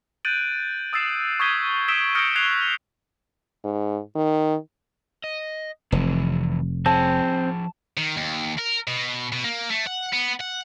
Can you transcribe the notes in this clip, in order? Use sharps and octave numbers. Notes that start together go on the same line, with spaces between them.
F#6 G6 A6 D7 D#7 F#7
D#6 E6 A6 C7 E7
C#6 D#6 G6 G#6 B6 G7
D#6 E6 B6 D7 E7 G7
D#6 F6 G6 A#6 C#7 D7
F#6 G#6 C7 F7 G7
G#2
D#3
D#5
F1 E3 C4
F3 C4 G#4 A5
D#3
D#2
A#4
B2
B2
A#3
A3
F#5
B3
F#5